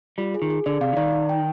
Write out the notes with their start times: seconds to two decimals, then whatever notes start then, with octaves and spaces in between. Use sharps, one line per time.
0.18 G3 F4
0.34 G#4
0.42 D#3
0.50 G#4
0.66 D3 D5
0.81 C3 F5
0.93 D3
0.97 D#3 D5
1.13 D#4
1.29 G5